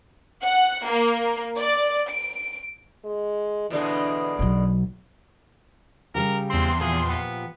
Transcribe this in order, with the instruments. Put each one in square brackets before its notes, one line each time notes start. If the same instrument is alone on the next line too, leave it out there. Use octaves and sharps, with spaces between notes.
[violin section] F#5
A#3
D5
D7
[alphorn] G#3
[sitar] B2 D3 G#3 [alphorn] E3
[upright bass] B1 F#3
[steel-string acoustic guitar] C#3 G3 G4 [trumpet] A#4
[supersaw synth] E2 C6 [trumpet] C4
[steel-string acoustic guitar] A#2 F3 G4 [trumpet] G#4
[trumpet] B3